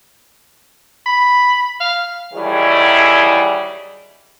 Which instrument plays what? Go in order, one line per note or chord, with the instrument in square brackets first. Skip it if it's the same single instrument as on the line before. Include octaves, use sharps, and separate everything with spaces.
[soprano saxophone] B5
F5
[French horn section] D#3 E3 F#3 G3 E4 G#4